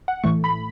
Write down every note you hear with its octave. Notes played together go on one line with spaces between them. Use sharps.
F#5
A2 E3 A3 C#6
B5